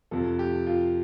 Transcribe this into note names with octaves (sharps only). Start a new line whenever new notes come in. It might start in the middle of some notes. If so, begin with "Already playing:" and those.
F2 C3 F3 A4
G4
F4